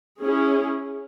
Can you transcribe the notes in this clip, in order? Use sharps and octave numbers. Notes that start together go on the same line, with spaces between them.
C#4 E4 G#4